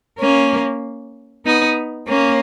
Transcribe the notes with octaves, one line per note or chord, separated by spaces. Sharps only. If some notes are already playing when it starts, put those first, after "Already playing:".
A#3 C#4
B3 D#4
A#3 C#4